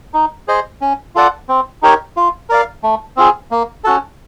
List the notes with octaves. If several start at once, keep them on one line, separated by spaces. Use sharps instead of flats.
D#4
G#4 C5 D#5
C#4
F4 A4 D5 F#5
C4
D#4 G4 A#4 C#5
F4
A#4 D5 F5
A3
C4 F4 G#4
A#3
C#4 F#4 A4